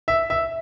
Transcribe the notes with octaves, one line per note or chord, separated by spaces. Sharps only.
E5
E5